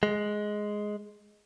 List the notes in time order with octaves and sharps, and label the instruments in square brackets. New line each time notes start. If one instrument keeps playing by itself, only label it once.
[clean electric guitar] G#3